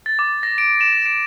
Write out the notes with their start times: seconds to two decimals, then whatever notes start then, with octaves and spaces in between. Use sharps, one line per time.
0.06 A6
0.19 D6
0.43 A#6
0.58 D7
0.81 E7
1.06 D7